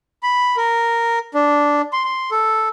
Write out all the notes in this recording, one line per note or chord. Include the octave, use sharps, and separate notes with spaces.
B5
A#4
D4
C6
C6
A4